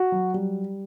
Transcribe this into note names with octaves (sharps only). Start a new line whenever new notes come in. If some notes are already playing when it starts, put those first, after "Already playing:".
Already playing: F#4
F#3
G3